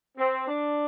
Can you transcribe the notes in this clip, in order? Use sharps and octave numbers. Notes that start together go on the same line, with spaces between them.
C4
D4